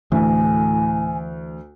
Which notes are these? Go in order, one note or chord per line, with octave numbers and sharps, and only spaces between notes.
D2 A2 E3 G#5